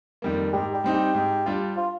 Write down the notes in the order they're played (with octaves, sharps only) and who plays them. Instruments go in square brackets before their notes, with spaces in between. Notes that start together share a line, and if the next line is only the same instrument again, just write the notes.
[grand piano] F2 D#3 G3 A#3
[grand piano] G#2 [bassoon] G4
[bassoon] G4
[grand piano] G3 C4 D#4
[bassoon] G4
[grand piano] G#2
G3 D4 F4
[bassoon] F4